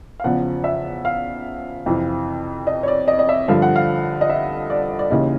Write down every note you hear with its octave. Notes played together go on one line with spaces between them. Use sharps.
F5
E2 C#3 F3 F#5
E5
F5
F2 C3 E3
D#5
C#5
D5
D#5
D#5
E5
G2 D3 F3 F5
F#5
F5
D#5
E5
D5
D5
D#2 C#3 E3 D#5